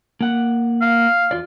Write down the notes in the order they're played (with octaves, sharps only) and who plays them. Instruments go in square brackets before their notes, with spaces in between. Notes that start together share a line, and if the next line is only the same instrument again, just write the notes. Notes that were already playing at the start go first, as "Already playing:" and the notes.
[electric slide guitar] A#3 F#5
[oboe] F5
[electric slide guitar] E2 F4 D5